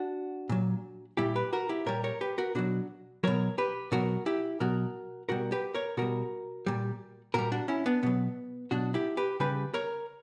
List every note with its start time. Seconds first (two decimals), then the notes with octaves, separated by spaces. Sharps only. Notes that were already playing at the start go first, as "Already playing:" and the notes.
Already playing: D4 F#4
0.49 A#2 F#3
1.17 A#2 G3 E4 G4
1.36 G4 B4
1.53 F#4 A#4
1.69 E4 G4
1.86 A#2 G3 A#4 C#5
2.04 A#4 C#5
2.21 G4 B4
2.38 F#4 A#4
2.55 B2 F#3 D4 F#4
3.24 B2 F#3 A#4 C#5
3.58 G4 B4
3.92 B2 F#3 F#4 A#4
4.26 E4 G4
4.60 B2 F#3 F#4 A#4
5.29 B2 G3 F#4 A#4
5.52 G4 B4
5.74 A#4 C#5
5.97 B2 G3 F#4 A#4
6.66 A#2 G3
7.34 A#2 G3 F#4 A#4
7.52 D4 F#4
7.68 C#4 E4
7.86 B3 D4
8.03 B2 F#3 B3
8.71 B2 F#3 D4 F#4
8.94 E4 G4
9.17 G4 B4
9.40 C#3 G3 G4 B4
9.74 A#4 C#5